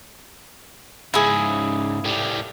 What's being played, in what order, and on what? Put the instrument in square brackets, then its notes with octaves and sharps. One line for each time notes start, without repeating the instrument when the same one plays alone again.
[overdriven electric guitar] G#2 C#3 [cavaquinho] E4 G#4
[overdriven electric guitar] A2 G3